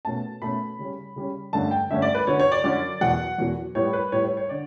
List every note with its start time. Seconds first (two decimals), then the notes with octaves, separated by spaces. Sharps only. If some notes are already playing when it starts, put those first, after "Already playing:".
0.05 B2 A3 C#4 A5
0.42 B2 A3 C#4 B5
0.79 C#3 G3 C#4
1.16 C#3 G3 C#4
1.53 G2 D3 A3 C#4 A5
1.71 G5
1.90 G2 D3 A3 C#4 E5
2.02 D5
2.15 B4
2.27 F#2 D3 F#3 C#4 C#5
2.39 C#5
2.52 D5
2.64 F#2 D3 F#3 C#4 D5
3.01 E2 B2 F#3 F#5
3.38 E2 B2 F#3
3.75 A2 G3 B3 C#5
3.93 B4
4.12 A2 G3 B3 C#5
4.25 C#5
4.37 C#5
4.49 D3 D5